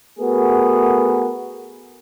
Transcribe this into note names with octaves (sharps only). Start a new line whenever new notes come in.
A3 B3 F#4 G#4 A#4